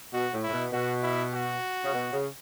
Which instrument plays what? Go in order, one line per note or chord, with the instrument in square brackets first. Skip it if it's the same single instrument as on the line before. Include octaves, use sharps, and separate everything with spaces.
[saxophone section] B2 [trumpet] F#4
[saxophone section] A2
[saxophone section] A2 [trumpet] E4
[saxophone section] B2
[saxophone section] B2 [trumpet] F#4
[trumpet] E4
F#4
[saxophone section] C#3
B2
C#3